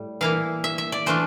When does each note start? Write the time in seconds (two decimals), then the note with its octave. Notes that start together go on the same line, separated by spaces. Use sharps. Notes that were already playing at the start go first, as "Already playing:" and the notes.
Already playing: A2 G3
0.21 E3 A#3 E4 F5
0.64 E5
0.78 E5
0.92 D5
1.06 E3 A3 D4 F4 C5